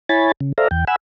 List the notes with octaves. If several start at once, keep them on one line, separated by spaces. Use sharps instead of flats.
E4 C#5 G#5 B5 A6
C#3
A4 C5 D5 E5 F5 A#5
E2 G5
F#5 G#5 B5 E6